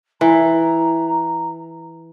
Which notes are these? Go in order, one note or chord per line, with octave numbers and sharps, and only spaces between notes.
E3 A#5